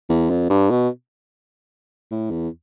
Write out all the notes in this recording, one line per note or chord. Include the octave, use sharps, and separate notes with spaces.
E2
F2
G2
B2
A2
E2